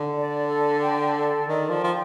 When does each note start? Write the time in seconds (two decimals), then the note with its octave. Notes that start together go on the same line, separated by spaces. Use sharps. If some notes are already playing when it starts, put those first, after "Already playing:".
Already playing: D3
0.14 D5
0.47 A4
0.81 G5
1.14 A4
1.48 D#3 D5
1.69 F3
1.81 F3 G5